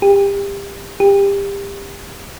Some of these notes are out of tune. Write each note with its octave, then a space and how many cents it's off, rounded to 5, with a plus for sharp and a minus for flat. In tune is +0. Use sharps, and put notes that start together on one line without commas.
G4 +30
G4 +25